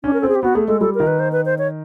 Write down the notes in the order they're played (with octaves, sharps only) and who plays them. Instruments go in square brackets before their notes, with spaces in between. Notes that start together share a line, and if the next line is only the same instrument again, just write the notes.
[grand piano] C#4 [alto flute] D4
[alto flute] A#4
[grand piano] C4 [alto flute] A4
[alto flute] G#4
G4
[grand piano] B3 [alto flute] F#4
[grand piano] A3 [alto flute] G#4
[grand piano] G#3 [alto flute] A4
[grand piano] G3 [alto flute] A4
[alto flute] A#4
[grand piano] D#3
[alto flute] B4
C5
B4
C5
C#5